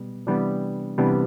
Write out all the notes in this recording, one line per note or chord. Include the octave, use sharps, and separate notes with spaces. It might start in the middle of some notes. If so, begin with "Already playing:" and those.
Already playing: B2 G3 B3
C3 E3 G3 B3 D4
C3 E3 G3 B3 D4